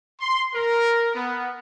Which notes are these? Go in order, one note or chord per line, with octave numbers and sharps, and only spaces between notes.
C6
A#4
B3